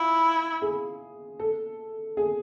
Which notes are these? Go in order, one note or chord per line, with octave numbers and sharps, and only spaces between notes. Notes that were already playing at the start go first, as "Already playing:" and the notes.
Already playing: E4 F4
G#4
A4
G#4